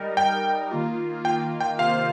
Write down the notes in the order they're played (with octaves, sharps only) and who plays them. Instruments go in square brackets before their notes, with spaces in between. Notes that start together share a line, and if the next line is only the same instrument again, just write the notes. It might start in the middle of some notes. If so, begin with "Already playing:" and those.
Already playing: [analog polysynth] G3 D#4 A#4
[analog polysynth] G3 D#4 A#4 [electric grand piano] G5
[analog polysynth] D#3 A#3 F4
[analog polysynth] D#3 A#3 F4 [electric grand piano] G5
[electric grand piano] G5
[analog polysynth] C3 D#3 A#3 F4 C5 [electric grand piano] F5